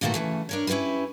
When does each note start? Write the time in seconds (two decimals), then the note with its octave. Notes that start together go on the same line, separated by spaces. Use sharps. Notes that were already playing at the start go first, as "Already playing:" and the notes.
0.01 E2 A#2 D#3 A3 F#4 A4
0.14 C#3 E3 A3
0.49 D4 A#4 C#5
0.67 C#4 E4 F4 G4 B4